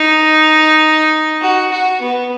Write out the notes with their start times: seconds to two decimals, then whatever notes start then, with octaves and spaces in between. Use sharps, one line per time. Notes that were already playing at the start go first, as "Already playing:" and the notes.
Already playing: D#4
1.42 F#4
1.72 F#4
2.01 B3